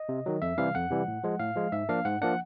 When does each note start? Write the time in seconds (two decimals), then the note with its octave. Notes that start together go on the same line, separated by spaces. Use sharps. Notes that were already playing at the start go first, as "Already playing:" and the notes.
Already playing: D#5
0.09 C3
0.26 D#3 F#3
0.42 F2 E5
0.58 C3 E3 G3 F5
0.75 F2 F#5
0.91 C3 E3 G3
1.08 A2
1.24 F3 G#3
1.39 A2 F5
1.56 F3 G#3
1.72 G#2 E5
1.89 F3 A#3 D4 F5
2.05 G#2 F#5
2.22 F3 A#3 D4 F#5